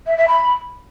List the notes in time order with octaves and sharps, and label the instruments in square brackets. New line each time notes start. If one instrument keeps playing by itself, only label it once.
[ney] E5
E5
B5